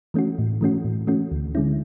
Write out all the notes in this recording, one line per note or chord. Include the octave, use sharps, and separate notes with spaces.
E3 A3 C#4 F#4
A2
E3 A3 C#4 F#4
A2
E3 A3 C#4 F#4
D2
D3 G#3 C#4 E4